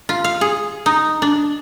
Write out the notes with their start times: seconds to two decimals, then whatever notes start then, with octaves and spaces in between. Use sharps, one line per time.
0.09 F4
0.24 F5
0.41 G#4
0.86 D#4
1.22 D4